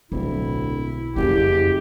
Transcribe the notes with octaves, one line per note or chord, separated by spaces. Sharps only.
D1 B1 E4
F#1 F2 G4